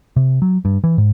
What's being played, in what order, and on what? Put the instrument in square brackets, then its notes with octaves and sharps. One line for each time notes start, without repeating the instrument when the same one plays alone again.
[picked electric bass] C3
F#3
G2
E3
G#2